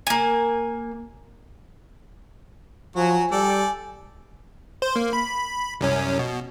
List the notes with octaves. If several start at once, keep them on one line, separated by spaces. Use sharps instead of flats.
A#3 G#5
F3 F#3 F#4 G#5
G3 A4 D5 G5
C5
A#3
B5
C2 F#2 C#4
B2